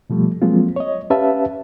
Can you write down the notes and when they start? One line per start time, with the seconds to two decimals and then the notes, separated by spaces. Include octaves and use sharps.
0.10 B2 F3 G3 A3
0.42 F3 F#3 G#3 A#3 C4 F4
0.76 C#5 D#5
1.10 C#4 G4 B4 E5 F5 A5